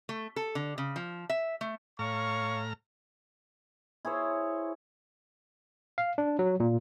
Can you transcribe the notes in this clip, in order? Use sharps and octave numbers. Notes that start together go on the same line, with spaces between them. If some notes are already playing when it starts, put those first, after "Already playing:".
A3
A4
D3
C#3
F3
E5
A3
A2 C#5 F5 A#5 C#6 F6
E4 G#4 C5 C#5
F5
D4
F#3
A#2